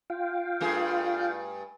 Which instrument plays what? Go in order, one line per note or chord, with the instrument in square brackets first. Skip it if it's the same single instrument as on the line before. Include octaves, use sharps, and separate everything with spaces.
[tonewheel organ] F4 F5 G5
[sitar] G2 A3 G#4